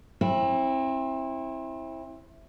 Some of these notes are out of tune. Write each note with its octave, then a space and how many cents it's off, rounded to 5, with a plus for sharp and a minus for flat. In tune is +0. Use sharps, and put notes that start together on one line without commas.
C4 +30 E4 -5